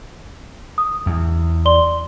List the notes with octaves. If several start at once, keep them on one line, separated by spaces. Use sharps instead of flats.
D#6
E2
D5 C6 G7